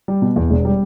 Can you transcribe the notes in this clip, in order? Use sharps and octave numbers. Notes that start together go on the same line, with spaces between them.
G3
B2
E2
E1
G3